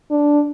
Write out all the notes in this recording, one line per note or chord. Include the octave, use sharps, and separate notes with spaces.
D4